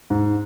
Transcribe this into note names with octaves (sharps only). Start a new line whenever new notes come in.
G#2